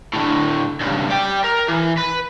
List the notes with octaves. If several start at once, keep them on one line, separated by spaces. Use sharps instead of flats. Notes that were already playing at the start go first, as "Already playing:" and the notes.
A2 D3
C#2 G2
D5 G5
A#4
E3
B4